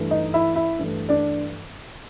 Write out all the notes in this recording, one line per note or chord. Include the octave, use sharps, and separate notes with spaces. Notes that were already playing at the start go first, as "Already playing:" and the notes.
Already playing: G2 E3 A3
D#4 D#5
E4 E5
E4 E5
G2 E3 A3
D4 D5